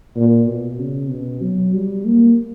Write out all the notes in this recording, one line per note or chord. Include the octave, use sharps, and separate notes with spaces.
A#2
B2
C#3
B2
F#3
G3
A#3